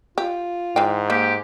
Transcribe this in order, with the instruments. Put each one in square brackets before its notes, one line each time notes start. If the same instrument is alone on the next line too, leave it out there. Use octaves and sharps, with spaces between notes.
[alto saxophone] F4 [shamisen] G4
[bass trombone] G#2 [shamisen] E3 F5 G5
[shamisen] A#3 [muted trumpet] G4